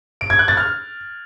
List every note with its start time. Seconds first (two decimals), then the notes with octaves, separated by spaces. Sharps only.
0.21 D7
0.30 G#6
0.39 F#6
0.48 A6
0.57 F6